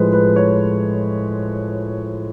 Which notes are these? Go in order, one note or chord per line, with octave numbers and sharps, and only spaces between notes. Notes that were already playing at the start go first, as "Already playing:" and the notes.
Already playing: A2 F3 G#3 B4 C5
B4
C#5